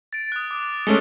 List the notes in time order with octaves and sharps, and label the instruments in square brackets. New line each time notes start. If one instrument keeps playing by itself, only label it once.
[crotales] A6 D7
D#6 F#6
D6
[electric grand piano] G#3 A3 C#4 [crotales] C#7 G7